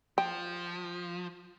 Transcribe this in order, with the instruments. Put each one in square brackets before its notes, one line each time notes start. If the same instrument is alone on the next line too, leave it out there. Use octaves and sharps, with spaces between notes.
[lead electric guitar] F3 [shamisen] G5